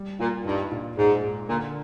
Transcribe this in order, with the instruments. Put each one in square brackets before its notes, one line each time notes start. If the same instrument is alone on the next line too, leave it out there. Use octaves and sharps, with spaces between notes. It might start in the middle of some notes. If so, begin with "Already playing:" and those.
Already playing: [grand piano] G3
[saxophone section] A#2 [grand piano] F4
[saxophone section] G2 [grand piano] D#4
[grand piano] A#2
[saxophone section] G#2 [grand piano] G#3
[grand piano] G#3
[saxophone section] A#2 [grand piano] D3